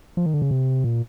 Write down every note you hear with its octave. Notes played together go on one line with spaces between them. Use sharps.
F3
D#3
D3
C#3
C3
A#2